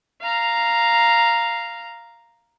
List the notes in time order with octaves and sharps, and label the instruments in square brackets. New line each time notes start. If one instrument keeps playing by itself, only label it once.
[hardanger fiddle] F5 A#5